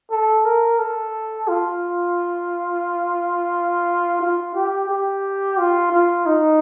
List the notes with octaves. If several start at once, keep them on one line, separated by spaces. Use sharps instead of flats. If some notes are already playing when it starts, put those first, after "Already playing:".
A4
A#4
A4
F4
F4
G4
G4
F4
F4
D#4